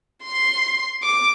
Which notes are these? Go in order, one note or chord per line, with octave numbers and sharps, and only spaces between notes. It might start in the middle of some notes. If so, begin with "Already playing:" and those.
C6
D6